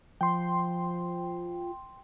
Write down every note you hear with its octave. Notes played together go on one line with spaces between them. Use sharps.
F3 G5 C6